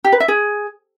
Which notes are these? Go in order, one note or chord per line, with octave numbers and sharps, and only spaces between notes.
G4
B4
E5
G#4